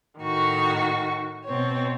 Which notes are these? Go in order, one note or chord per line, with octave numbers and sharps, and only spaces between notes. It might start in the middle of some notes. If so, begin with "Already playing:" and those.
A2 D#3 F#4 C#6
B2 C4 C#5